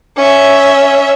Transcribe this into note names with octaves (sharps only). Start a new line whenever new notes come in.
C#4 E5